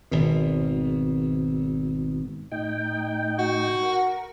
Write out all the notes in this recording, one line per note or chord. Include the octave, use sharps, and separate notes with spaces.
G#1 B2
A2 D#4 G5
F#4
A#4